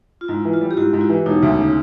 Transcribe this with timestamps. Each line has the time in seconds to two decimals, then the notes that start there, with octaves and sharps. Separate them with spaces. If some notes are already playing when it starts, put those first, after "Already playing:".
0.21 F4
0.28 G#2 E4
0.45 E3
0.53 F4
0.61 G3
0.71 G4
0.77 G#2 E4 F#4
0.93 G#2
1.01 E4
1.09 E3
1.26 E1 D#4
1.43 D2
1.59 C#3